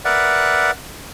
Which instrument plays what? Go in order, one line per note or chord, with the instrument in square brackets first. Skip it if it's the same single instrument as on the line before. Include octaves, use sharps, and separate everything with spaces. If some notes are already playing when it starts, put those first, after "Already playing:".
[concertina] A#4 B4 D5 E5 F#5